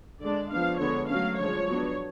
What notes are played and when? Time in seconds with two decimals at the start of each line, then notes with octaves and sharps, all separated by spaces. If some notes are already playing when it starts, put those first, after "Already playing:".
0.21 D3 G#3 D4 D5
0.50 F3 B3 D4 F5
0.80 D3 G#3 B3 C#5
1.09 F#3 A3 C#4 F5
1.39 D3 F3 G#3 C#5
1.68 F#3 B3 D4